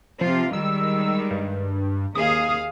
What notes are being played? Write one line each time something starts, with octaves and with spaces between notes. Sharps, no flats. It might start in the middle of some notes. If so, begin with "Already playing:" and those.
C3 F3 F4
D#3 G3 G#3 E6
G2
D#2 G#4 F5 D#6